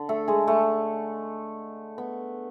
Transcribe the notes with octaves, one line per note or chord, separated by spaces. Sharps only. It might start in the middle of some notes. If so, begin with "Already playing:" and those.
Already playing: D3
A3 A4
G#3 G#4
A3
B3